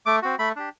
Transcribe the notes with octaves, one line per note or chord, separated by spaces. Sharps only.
A3 D6
C4 F#4
A3 B5
D4 G4